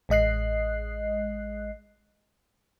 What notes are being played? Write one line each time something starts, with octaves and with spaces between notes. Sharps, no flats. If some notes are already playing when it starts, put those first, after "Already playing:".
A1 G#3 D#5 F#6 C7